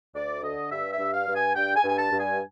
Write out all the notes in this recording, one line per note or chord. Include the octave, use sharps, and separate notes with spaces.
D2 D5
D3 D#5
G2 E5
E5
G2
F5
G2
G#5
G2 G5
G#5
G2
G#5
A5
G2
G#5